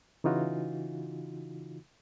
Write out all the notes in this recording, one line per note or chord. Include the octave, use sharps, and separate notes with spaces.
C#3 E3 D#4 F4 F#4